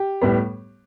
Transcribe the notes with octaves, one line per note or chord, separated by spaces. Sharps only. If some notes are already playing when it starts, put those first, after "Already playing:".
Already playing: G4
A2 G3 B3